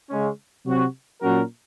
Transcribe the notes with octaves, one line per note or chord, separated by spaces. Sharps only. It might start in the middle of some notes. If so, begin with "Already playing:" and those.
C#3 G#3 C#4
C3 F#3 C4 F#4
A#2 F#3 C#4 F#4 A#4